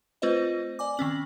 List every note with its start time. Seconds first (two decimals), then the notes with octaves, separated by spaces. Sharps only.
0.22 A3 C4 F4 B4 C5 D#5
0.79 D5 G#5 D6
0.97 D#3 C4 C#4 F#7